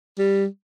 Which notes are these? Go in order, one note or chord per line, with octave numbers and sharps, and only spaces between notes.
G3